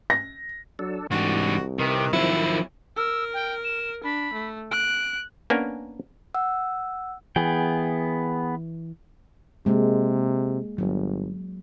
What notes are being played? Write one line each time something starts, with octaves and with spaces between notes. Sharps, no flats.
A#6
F#3 D4 A4
C2 G#2 E3 D4 F#4
C3 D#3 B4
D#3 F3 F#3 C4 E4
A#4 E6
G5
E7
D4 B5
A3
F#6 D7
A#3 B3 C#4 D4 A#4 G#5
F#5 E6
E3 B3 G#4 G5
C3 G#3 A#3
G1 F#3